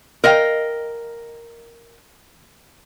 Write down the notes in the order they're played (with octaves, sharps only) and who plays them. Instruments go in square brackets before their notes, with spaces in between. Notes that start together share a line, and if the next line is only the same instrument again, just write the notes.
[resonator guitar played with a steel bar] A#4 D#5 F5 G5